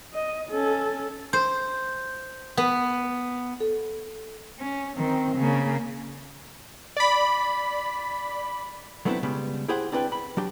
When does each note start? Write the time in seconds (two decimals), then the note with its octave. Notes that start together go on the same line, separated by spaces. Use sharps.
0.13 D#5
0.49 C#4 A4
1.33 C5
2.57 B3
3.60 A4
4.59 C#4
4.97 D#3 C4
5.37 C#3 A#3
6.97 D5 B5
9.05 F#3 A3 B3 C4 D4 E4
9.23 C#3 G3 G#3 B3
9.68 E4 G4 G#4 C5 F#5
9.92 C4 D4 E4 B4 D5 G5
10.12 B5
10.37 F#3 D4 G4